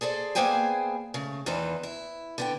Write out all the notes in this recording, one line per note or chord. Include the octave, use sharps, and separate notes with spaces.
G#4 A4 C5 D5
A#3 B3 G#4 C5 G5 G#5
C#3 A3
E2 D#3 E3 D#4 B4 C5
E4
D3 B3 G5